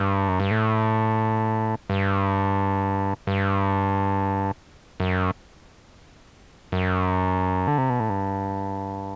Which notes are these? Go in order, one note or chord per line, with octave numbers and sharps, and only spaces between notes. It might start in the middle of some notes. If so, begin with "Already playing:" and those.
Already playing: G2
F#2
G2
A2
G2
G2
F#2
F#2
D3
C3
B2
A2
G2